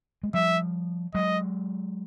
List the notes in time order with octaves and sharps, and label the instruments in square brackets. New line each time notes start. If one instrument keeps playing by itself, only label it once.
[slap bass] G#3
[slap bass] F3 G3 [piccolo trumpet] E5
[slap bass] F#3 G#3 [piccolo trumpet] D#5